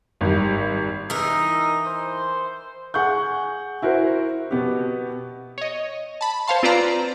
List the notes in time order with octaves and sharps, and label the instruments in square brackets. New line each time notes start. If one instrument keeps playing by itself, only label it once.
[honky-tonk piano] G#1 G3
[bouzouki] E3 A#4 [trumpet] D#4
[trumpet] C5
[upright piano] G#4 F#5 C#6 G6
E4 F#4 A#4 C5
B2 B3 G4
[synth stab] C#5 D#5
A5 B5
C5 C#5 F5 A5 C6
C4 F4 B4 C5 D5 A#5